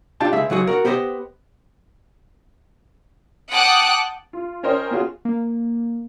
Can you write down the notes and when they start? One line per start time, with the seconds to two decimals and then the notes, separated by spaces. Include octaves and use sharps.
0.20 D4 F4 G4 G5 A5
0.33 C#2 G#3 G#4 E5
0.50 C#2 F#3 F#4 G#4
0.67 F#4 A#4
0.85 B3 G4 C5 C#5 D#5
3.50 F#5 G5 A5 D6 D#6 F#6
4.33 F4
4.63 C#4 A#4 C5 D#5 G5
4.91 B3 C#4 F4 F#4 G#4
5.25 A#3